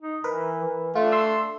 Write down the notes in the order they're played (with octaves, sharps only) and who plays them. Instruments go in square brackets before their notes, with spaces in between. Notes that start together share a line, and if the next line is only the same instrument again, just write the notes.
[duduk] D#4
[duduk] E3 [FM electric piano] A#4 B4
[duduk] E3
[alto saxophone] A3 [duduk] D4 [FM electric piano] F4
[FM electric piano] C6 E6